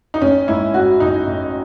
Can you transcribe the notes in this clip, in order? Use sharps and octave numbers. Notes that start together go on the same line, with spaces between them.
D#4
A1 C#4
G#2 E4
A1 F#4
A1 D#4
A1